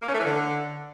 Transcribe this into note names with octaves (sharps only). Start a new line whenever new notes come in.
A#3
C#4
A3
E3
D3